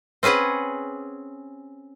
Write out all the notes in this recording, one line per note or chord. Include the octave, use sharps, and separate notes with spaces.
C4 C#4 G#4 B4 F#5